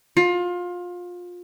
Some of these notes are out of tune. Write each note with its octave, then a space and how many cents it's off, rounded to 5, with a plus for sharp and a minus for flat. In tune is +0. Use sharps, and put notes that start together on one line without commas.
F4 +25